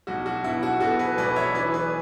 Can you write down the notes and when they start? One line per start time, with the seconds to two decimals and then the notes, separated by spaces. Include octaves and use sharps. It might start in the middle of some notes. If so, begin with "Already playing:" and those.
0.07 B1 F#4
0.26 F#4
0.44 B2 E4
0.63 F#4
0.80 B2 F#4 A4
0.99 G#4 B4
1.18 B1 B4 D5
1.36 C#5 E5
1.55 E3 B4 D5
1.74 G#4 B4